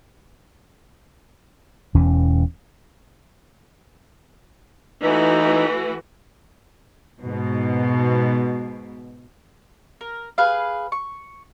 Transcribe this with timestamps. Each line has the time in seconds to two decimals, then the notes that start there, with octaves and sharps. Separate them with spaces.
1.94 E1 E2 E3 C#4
5.02 E3 A3 D#4 F#4
7.20 G#2 B2
10.01 A#4
10.38 G#4 B4 F5
10.92 C#6